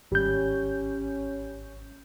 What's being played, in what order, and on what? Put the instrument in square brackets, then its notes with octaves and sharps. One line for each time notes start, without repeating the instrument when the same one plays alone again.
[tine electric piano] G#1 G6 [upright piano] G3 [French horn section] C#4